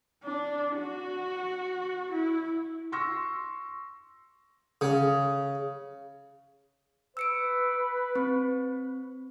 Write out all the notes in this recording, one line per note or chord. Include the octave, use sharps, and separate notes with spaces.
D4
F#4
E4
C6 C#6 E6 A#6
C#3
B4 E6 C#7 D7
C4